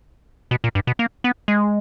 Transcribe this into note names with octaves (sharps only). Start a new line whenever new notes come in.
B2
A#2
G2
B2
A#3
B3
G#3